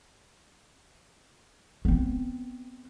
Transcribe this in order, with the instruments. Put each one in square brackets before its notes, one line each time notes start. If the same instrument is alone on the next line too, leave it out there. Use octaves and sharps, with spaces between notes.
[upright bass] B3 C4